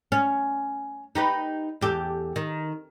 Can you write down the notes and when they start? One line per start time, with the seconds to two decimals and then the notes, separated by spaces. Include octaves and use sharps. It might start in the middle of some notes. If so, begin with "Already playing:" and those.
0.12 C#4
1.15 D#4 G4 B4
1.81 E2 G4 A4
2.36 D#3